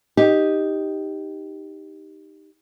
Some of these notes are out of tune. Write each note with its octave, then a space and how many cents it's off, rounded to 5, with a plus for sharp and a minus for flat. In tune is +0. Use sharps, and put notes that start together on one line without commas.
D#4 +0 G4 +0